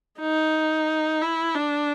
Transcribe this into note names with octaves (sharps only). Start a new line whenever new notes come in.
D#4
E4
D4